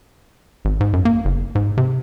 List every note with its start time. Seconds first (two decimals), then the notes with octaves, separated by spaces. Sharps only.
0.65 G#1
0.80 G#2
0.93 F#2
1.05 A#3
1.25 F#1
1.55 G#2
1.77 C3